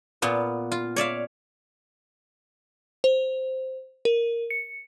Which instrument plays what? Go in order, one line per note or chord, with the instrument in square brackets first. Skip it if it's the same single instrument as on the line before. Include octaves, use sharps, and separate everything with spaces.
[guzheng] A#2 B3 F4
F4
C#5 D5 E5 F5
[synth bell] C5
A#4
C#7